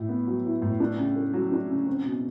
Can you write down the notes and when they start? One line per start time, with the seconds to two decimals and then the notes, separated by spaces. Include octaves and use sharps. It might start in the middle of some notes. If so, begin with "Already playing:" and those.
Already playing: A2 E4
0.09 B3
0.27 F#3
0.45 E4
0.62 A2
0.80 D4
0.98 C#3
1.16 A3
1.34 F#3
1.52 D4
1.70 C#3
1.87 C4
2.05 B2